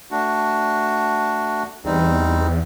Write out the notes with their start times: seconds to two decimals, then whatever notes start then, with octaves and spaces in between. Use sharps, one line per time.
0.11 A3 D4 F#4
1.85 E2 G3 C4 D#4